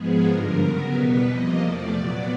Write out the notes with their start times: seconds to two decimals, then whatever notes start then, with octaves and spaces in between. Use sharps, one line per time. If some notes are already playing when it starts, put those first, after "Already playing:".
Already playing: G#2 F3 G#3 B3 G#4
0.26 G2 D3 F3 A#4
0.60 C#3 F#3 B3
0.93 E2 B2 G3 B3 B4
1.26 C3 F3 A#3 D#5
1.59 E2 C3 F3 A3 D5
1.93 A#2 F#3 B3